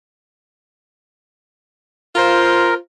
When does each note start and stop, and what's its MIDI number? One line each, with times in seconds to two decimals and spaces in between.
2.16 2.76 65
2.16 2.74 70
2.16 2.76 72